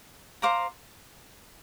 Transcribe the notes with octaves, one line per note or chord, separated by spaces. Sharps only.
C5 F5 A#5 D6